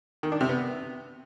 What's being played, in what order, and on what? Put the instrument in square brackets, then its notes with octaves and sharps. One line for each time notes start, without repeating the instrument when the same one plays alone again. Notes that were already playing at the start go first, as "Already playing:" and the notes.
[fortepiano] D#3
D4
C3
B3